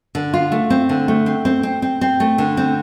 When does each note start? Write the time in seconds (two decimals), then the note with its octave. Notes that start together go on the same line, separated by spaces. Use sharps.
0.15 D3
0.33 F4
0.52 A3
0.70 C4
0.89 D3
1.08 A3
1.26 C4
1.45 C4
1.63 C4
1.82 C4
2.01 C4
2.20 A3
2.38 D3
2.57 C4